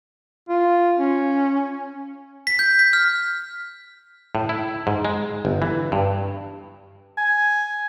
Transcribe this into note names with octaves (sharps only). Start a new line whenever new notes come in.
F4
C#4
B6
G6
B6
F6
A2
E4
G#2
G#3
G1
E3
G2
G#5